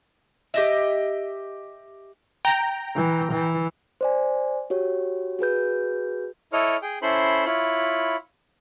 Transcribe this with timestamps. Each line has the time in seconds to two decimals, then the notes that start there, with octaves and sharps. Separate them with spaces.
0.54 G4 D#5 E5
2.45 G5 A#5
2.96 E3
3.32 E3
4.01 C5 D5 G#5
4.70 F#4 G4 C#5
5.39 F#4 G#4 B4 G6
6.53 E4 A4 C#5 D#5 F6
6.82 G#4 G5
7.02 C#4 E4 A4 C5 B5 C6
7.46 E4 F4 C#5 B5